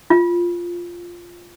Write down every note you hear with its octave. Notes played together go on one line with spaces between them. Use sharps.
F4